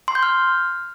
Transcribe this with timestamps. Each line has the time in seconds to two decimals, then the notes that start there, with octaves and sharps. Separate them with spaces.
0.08 C6
0.15 G6
0.23 F6